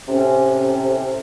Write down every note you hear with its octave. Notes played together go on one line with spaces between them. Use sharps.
A2 C3 C#4